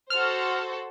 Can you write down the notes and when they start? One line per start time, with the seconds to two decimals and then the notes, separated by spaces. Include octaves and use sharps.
0.10 F#4 A4 C5 F6